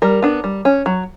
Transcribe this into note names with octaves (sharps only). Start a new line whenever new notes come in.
G3 A#4
B3 D4
G3
C#4
F#3